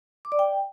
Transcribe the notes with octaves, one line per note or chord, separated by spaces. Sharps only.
D6
D5
G5